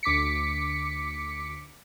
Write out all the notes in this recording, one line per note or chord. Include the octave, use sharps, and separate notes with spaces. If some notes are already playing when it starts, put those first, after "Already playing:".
D2 D6 B6 C#7